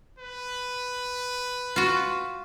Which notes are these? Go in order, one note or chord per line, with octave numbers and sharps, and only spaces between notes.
B4
F4 F#4